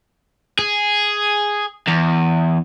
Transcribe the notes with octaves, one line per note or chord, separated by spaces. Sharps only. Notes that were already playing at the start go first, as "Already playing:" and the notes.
G#4
E2